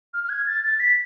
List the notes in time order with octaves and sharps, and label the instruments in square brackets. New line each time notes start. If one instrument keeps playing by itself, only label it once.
[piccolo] F6
F6
G#6
A6
A6
B6